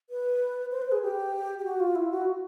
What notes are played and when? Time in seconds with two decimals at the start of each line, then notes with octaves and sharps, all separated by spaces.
0.10 B4
0.71 C5
0.82 B4
0.92 G#4
1.02 G4
1.59 G4
1.65 F#4
1.80 F4
1.95 E4
2.10 F#4